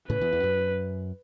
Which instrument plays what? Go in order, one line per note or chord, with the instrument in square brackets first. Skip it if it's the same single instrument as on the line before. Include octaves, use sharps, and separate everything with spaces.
[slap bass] A2 C#3 [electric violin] B4
[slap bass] E2
E2
F#2